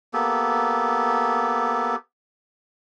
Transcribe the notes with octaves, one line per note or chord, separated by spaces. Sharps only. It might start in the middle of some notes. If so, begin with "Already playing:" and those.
A#3 B3 G4 A4